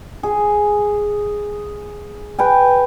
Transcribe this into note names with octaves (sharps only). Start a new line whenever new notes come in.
G#4
B4 G5 G#5